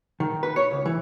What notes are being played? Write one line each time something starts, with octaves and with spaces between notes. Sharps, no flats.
D#3
B4
C#5
C#2
E3